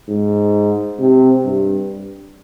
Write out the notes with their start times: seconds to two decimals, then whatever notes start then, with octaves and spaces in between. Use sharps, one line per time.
0.08 G#2
0.99 C3
1.45 G2